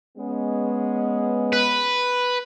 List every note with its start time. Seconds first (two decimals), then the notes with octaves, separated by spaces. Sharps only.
0.18 G#3 B3 C#4
1.53 B4